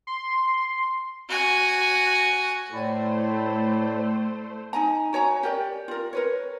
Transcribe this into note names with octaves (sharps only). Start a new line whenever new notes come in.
C6
F#4 G#5
A2 A3 E4 C5 D5
D#4 G#5 A#5
F#4 C#5 G#5 A#5
G4 A#4 D5
F4 A#4
A#4 B4 C#5